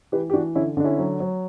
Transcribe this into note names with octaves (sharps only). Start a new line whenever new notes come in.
E3 G4 B4
G4
E3 D4 F#4
D3 C#4 E4
D3 D4
C#4 E4
F#3
F#3